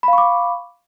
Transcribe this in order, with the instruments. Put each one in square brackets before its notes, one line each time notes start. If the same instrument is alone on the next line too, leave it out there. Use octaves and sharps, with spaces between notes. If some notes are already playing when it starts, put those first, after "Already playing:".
[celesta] B5
F5
C#6
D6